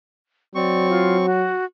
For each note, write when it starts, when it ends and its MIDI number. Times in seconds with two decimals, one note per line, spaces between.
0.55 1.54 54
0.55 1.26 60
0.55 0.87 74
0.55 1.26 85
0.90 1.17 65
1.25 1.65 66